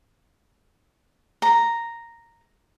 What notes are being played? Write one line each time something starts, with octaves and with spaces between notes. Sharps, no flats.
A#5